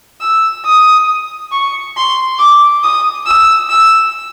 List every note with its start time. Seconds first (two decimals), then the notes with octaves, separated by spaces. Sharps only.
0.21 E6
0.65 D#6
1.52 C#6
1.96 C6
2.39 D6
2.84 D#6
3.26 E6
3.70 E6